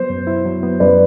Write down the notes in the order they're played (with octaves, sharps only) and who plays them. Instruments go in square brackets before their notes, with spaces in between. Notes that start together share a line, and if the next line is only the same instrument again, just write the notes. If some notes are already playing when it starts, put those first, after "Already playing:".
Already playing: [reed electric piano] F#3 B3 [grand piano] C5
[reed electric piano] F#2
E4
F#3
B3
[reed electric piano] F#2 [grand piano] B4 D5